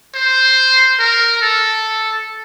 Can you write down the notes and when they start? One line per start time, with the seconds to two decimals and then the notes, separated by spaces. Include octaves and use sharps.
0.15 C5
0.99 A#4
1.41 A4